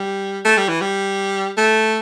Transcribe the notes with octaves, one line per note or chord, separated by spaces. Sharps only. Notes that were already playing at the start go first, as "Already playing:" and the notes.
Already playing: G3
A3
G3
E3
G3
A3